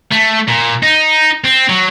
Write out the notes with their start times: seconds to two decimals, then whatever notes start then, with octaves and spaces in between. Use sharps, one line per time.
0.11 A3
0.48 A#2
0.83 D#4
1.44 C4
1.69 F#3